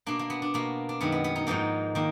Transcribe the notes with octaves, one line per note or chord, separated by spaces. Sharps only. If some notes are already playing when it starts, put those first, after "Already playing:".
B2 A#3 D4
A#3
B3
D4
B2 A#3
D4
F#2 D#3 G#3 B3
B3
B3
D#4
G#2 F3 A#3 D#4
D#3 A#3